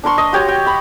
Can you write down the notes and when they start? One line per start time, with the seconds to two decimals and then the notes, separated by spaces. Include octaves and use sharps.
0.03 D4 A#4 C6 C#6
0.18 D#5
0.33 F#4 G4 C#5
0.48 G5
0.67 B5